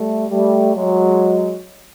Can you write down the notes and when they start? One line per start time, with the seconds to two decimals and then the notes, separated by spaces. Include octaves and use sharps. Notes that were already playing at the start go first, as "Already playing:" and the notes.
Already playing: G3 A3
0.30 G3 A3
0.75 F#3 G#3